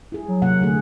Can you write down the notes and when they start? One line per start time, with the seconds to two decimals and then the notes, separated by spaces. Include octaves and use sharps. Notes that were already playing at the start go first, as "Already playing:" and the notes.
0.12 E4 G#4
0.28 F#3
0.42 C3 A#3 F#5
0.61 D3 A3 G#4